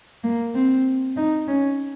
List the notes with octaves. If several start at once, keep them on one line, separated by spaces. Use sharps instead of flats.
A#3
C4
D#4
C#4